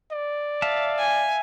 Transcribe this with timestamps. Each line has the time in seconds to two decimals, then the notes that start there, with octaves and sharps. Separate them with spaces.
0.12 D5
0.62 E5 F5 A5
0.97 G#5